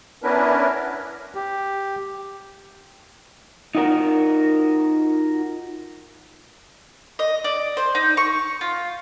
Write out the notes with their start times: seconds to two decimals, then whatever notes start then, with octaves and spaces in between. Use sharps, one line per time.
0.23 B3 C#4 D4 E4 A#4 B4
1.35 G4
3.75 D#4 F4 F#4 A#4
7.19 D#5
7.44 D5
7.77 C5
7.95 D#4
8.17 C#6
8.61 F4